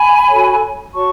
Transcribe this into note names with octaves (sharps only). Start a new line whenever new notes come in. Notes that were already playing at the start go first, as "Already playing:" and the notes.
Already playing: G#5 B5
F#4 A4 C#5
F#4 C#5 A5 C#6